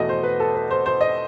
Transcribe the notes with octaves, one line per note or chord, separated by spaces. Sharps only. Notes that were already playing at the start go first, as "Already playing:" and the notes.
Already playing: E2 B2 A3 D#5 F#5
C5
B4
A4
B4
C5
C5
D#5